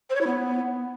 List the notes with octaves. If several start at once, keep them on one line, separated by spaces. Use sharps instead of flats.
C5
C#5
E4
B3